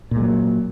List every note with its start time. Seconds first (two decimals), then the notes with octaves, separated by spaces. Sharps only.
0.11 A#2
0.16 G#3
0.20 F#3
0.25 A#3